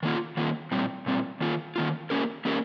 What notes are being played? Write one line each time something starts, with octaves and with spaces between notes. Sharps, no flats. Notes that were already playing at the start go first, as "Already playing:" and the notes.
D#3 A#3 F4
D#3 A#3 F4
A#2 G3 C4
A#2 G3 C4
D#3 A#3 F4
D#3 A#3 F4
A#3 C#4 G4 A#4
A#3 C#4 G4 A#4